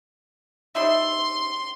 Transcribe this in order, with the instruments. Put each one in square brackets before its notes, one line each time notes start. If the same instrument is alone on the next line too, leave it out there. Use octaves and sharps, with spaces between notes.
[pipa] G3 D#4 E5 [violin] C6